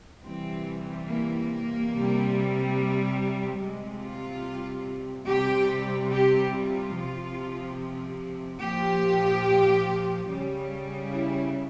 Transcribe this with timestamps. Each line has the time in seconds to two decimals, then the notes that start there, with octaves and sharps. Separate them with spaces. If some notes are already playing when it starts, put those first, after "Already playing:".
0.23 C3 E3 G3 C4
1.08 A#3
1.91 C3 G3
3.59 C3 G3 G#3
4.01 F4
5.26 C3 G3 G4
6.10 G4
6.53 F4
6.94 C3 F3
8.61 A#2 F3 G4
10.29 C#3 G3
11.13 E4